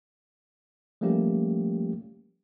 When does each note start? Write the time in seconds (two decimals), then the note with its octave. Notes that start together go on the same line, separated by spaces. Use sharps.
1.01 F3 G3 A3 A#3 C#4 G4